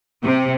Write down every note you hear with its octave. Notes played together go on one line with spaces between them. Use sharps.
C3